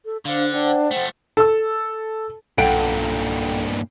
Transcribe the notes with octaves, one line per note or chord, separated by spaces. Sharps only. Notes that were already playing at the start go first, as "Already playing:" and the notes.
A4
D3 D4 C5 F5
D4 C5 F#5 G5
F3 A3
A4 E6
B1 G2 A#2 A4 F#5 G5 D7